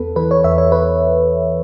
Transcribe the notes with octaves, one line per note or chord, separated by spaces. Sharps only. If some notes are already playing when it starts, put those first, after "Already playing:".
Already playing: E2 B3 A4 B4
E3 B4
C#5
E2 E5
C#5
B4